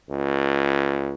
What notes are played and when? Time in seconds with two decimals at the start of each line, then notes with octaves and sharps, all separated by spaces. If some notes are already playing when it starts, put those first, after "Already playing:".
0.10 C#2